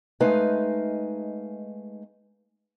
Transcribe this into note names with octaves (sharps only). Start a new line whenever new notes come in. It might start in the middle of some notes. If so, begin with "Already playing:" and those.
G#3 A3 D#4 B4 F5 G#5